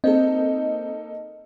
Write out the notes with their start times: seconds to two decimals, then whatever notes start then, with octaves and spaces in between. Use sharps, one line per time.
0.04 A#3 C4 D#4 A4 D#5